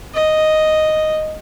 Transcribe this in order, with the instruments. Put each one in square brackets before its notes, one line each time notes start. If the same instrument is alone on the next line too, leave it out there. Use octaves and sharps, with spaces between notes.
[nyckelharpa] D#5